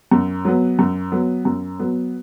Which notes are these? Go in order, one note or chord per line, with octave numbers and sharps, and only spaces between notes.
F#2
F#3 B3
F#2
F#3 B3
F#2
F#3 B3